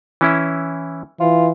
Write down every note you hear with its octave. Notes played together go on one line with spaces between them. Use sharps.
E3 C#4 E4
E3 F4